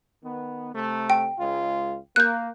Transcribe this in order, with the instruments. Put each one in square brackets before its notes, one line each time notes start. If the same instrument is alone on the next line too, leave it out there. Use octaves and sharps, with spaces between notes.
[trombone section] D#3 B3
C3 A3
[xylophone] G5
[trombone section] C#2 G#3 F4
[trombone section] A#3 [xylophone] F#6 G6